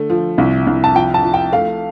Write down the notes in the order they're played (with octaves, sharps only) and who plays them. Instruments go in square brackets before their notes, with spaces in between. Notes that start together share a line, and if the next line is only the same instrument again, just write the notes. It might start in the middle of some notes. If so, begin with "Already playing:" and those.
Already playing: [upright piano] D3 A3
F3
C2
C2
A5
F3 G5
A5
F3
G5
A3 F5